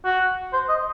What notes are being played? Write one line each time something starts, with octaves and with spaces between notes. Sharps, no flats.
F#4
C5
D#5